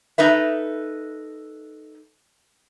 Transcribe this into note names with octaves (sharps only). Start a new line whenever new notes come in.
D#4 A4 B4 E5